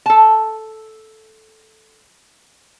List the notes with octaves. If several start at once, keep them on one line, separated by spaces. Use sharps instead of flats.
A4 A5